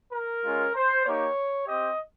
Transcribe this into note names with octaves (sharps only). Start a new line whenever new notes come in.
A#4
G#3 C#4 F4
C5
A#3 D#4 G4 C#5
C4 G4 D#5